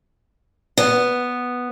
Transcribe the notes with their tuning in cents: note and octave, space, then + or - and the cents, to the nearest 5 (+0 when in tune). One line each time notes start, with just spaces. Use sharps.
B3 +0